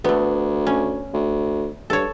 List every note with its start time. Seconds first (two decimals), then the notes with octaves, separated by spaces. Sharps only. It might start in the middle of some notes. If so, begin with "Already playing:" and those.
0.04 D2 A3 B3
0.67 C#4
1.14 D2
1.90 G2 A4 C#5